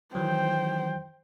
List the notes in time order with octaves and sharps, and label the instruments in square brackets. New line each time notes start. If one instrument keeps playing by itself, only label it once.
[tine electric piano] D#3 E3 F#3 [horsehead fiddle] C5 G5